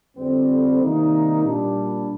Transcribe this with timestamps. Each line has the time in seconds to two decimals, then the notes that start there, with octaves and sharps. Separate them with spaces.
0.17 F2 D3 G3 C4
0.80 C3 D#3 G3 A#3 D#4
1.44 A#2 G3 D4